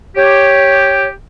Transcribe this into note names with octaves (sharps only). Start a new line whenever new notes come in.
G4 C#5